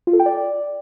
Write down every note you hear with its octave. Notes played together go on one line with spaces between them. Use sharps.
F4
A4
G5
D5